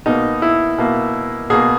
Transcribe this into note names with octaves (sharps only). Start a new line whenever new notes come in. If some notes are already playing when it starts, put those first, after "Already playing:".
B2 A#3 D#4
E4
B2 A#3
B2 A#3 G#4